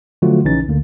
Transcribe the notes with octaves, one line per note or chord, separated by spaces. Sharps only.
D3 F3 F#3 A3 F4 F#4
A#1 C#3 E3 C#4 D#4 A6
D2 D3 A#3